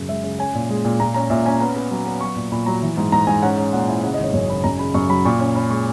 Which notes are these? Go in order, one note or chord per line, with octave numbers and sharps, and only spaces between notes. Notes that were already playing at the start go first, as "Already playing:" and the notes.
Already playing: F#2 C#3
G#3 E5
C#3
C#4 G#5
A#2
G#3
A#2
A#2 A#5
C#4 A#5
A#2 E5
C#4 G#5
B3 A#5
B3
F#3
B3
F#3 C#6
A#2
A#2 B5
F#3 A#5
E3
G#2
G#2 A#5
G#2 G#5
C#4 F#5
C#4
A#2 F#5
E4 G#5
C#3 F#5
D#5
G#1 C#5
F#2 C#5
C#3 B5
F#2 A#5
C#3 B5
F#2 C#6
F#3 B5
A#2 C#6
C#4
C#4 B5
G#3 C#6